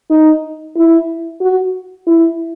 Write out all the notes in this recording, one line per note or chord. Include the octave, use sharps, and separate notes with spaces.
D#4
E4
F#4
E4